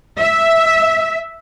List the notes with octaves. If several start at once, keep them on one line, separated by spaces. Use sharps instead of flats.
E5